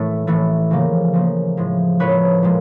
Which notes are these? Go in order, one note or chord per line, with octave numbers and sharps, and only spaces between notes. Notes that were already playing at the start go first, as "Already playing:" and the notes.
Already playing: A2 E3 A3
A2 E3 A3
C#3 F3 A#3
C#3 F3 A#3
A2 F3 G#3
A2 F3 G#3 B4 C#5
A#2 F3 G#3